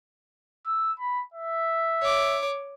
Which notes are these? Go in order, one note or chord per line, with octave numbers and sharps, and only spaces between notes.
E6
B5
E5
C#5 D6